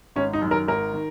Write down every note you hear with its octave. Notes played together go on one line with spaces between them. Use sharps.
G#1 C#4
D#4
F#2 D#3
A#4
G#1 A#4
D#3